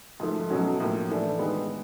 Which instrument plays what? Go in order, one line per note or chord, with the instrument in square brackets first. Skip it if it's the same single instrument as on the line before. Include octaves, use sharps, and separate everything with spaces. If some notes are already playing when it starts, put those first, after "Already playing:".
[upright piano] G#2 F3 A3
B2 F#3 A3 C#4 F#4
A2 F3 A#3
E3 A3 D4
D#3 G#3 B3